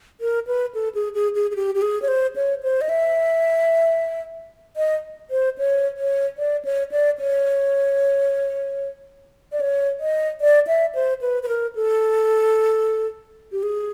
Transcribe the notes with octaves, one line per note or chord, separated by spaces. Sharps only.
A#4
B4
A4
G#4
G#4
G#4
G#4
G4
G4
G#4
C#5
C5
C#5
C5
D#5
E5
D#5
C5
C#5
C#5
D5
C#5
D5
C#5
D5
C#5
D#5
D5
E5
C5
B4
B4
A#4
A4
G4
G#4